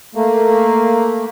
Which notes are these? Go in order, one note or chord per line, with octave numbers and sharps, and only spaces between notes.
A3 A#3